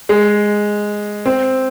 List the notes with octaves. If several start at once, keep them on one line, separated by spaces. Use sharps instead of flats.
G#3
C4